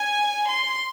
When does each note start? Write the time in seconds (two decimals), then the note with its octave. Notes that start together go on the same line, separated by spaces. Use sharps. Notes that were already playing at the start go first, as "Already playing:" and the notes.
Already playing: G#5
0.49 C6